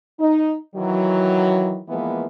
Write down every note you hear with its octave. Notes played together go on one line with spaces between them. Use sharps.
D#4
D#3 E3 F#3
E3 F3 G#3 A#3 B3